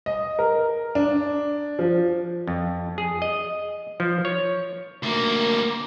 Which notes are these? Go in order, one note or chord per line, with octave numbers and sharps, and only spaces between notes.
D#5
A#4
D4
F3
F2
G#4
D#5
F3
C#5
D2 A#3